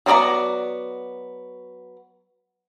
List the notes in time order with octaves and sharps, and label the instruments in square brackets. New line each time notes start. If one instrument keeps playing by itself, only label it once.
[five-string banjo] F#3 B3 A#4 D5 A#5